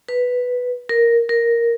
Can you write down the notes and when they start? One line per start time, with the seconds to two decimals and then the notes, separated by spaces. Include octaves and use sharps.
0.09 B4
0.89 A#4
1.29 A#4